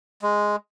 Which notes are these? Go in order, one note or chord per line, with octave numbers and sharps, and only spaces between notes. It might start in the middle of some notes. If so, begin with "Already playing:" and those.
G#3